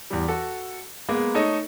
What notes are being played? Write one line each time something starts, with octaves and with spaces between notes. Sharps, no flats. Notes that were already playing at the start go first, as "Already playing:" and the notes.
E2 G3
F#4 A4
G#3 A#3 B3
A3 D#4 C#5 D#5